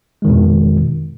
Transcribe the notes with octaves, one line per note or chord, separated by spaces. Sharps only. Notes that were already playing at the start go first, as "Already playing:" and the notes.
F2 B2 D#3 G#3